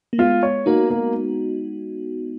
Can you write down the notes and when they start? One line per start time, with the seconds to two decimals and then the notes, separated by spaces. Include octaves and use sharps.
0.13 A#3
0.18 G#3 B3 F4
0.43 C#5
0.66 A#3 D#4 F#4
0.90 A#3